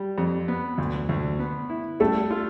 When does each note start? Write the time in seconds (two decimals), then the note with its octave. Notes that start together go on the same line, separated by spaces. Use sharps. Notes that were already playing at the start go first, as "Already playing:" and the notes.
Already playing: G3
0.18 F2
0.48 B3
0.78 D2
1.09 D2
1.39 B3
1.69 E4
2.00 G3 A3 A4
2.30 F4